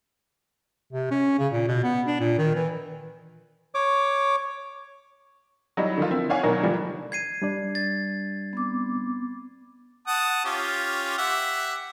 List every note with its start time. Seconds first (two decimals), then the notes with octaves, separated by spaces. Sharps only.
0.92 C3
1.11 C#4
1.39 C#3
1.52 A#2
1.68 B2
1.83 B3
2.07 D4
2.20 A#2
2.38 D#3
2.55 E3
3.75 C#5 D6
5.77 F#3 G3 D#4 E4
5.98 D3 D#3 F3 F4
6.11 A#3 C4 E4
6.30 C#5 D5 F5 F#5 G#5 C#6
6.43 B2 D#3 F#3 A#3 D4 A#4
6.63 D3 E3 F3 G3 D4
7.12 G#6 C7 D#7
7.42 G3 D4 D5
7.75 A6
8.53 B3 C4 D6
10.07 F#5 A5 D#6
10.45 C#4 F4 G4
11.18 G4 E5 F#5